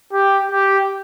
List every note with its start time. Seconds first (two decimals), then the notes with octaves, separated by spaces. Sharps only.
0.13 G4
0.52 G4